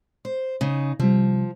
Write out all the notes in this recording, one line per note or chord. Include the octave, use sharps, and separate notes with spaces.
C5
C#3 D#4
C3 F3 G3